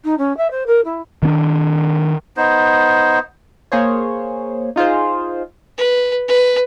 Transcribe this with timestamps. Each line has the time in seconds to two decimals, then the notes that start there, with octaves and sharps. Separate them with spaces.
0.04 D#4
0.18 C#4
0.37 E5
0.51 C5
0.67 A#4
0.85 E4
1.23 D#3 C#4 D4
2.37 B3 D#4 C5
3.72 A#3 G#4 C5 C#5
4.76 D#4 F4 G#4 C5
5.78 B4
6.28 B4